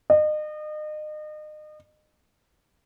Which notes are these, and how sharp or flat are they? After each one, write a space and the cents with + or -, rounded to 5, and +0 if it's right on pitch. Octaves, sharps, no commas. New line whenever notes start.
D#5 -35